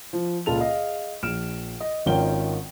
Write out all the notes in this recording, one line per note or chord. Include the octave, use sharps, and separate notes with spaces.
F3
C#2 A#2 F4 A4 A5 F7
G#4 D#5 F5
A#1 F6 D7 E7
D#5
G#1 D#3 C#4 F4 G5 G7